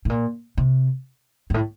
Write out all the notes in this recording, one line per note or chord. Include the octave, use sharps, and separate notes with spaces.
A2
A#2
C3
G2
A2